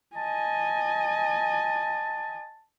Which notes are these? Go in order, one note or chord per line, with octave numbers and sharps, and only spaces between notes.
D#5 G#5 A5